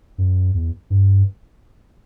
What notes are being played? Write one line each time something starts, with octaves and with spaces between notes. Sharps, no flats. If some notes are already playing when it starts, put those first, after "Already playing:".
F#2
E2
G2